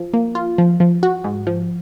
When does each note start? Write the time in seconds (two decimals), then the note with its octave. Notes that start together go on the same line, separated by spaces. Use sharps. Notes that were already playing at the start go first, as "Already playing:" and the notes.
Already playing: F3
0.14 A#3
0.35 F4
0.58 F3
0.80 F3
1.03 F#4
1.24 G#2
1.47 F3